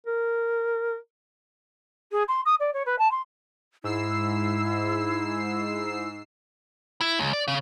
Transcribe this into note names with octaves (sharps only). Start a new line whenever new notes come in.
A#4
G#4
C6
D#6
D5
C#5
B4
A5
C6
G#2 E4 E6 C7
E4
C#2
D5
C#3